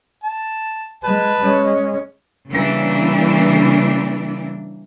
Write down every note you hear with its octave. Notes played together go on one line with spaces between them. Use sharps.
A5
G#3 B4 A5
G#3 C#4
C#3 E3 G3 A#3 D4